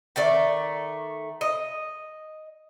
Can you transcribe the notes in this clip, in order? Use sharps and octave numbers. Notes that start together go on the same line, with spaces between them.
D#3 A3 D5
D#5